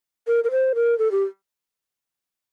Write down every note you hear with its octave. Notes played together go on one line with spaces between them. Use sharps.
A#4
A#4
C5
A#4
A4
G4